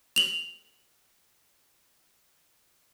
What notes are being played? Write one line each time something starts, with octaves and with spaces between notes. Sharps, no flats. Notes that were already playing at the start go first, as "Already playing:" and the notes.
F7 F#7